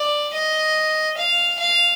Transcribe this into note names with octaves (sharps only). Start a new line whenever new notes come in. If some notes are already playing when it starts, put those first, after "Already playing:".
Already playing: D5
D#5
F5
F5